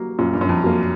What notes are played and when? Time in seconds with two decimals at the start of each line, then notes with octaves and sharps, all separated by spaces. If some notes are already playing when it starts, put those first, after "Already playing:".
Already playing: F#3 A#3
0.19 F#2 A#2
0.33 G2
0.41 F#2
0.49 F2
0.63 F#3 A#3